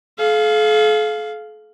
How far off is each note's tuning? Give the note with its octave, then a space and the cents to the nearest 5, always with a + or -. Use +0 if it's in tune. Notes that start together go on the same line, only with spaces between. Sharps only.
A4 -45 F5 +0